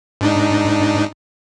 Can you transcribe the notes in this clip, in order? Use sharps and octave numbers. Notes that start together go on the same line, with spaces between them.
G#2 D4 D#4